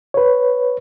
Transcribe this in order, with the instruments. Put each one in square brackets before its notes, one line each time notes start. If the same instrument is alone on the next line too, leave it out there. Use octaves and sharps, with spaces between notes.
[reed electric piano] B4 C#5